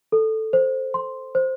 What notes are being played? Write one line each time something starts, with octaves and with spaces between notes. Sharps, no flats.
A4
C5
C6
C5